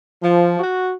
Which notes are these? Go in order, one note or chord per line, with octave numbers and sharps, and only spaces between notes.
F3
F#4